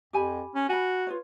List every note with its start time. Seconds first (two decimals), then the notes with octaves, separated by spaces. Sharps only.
0.13 F2 G4 G#5 B5
0.55 C#4
0.69 F#4 G#5 B5
1.07 F4 B4 C#5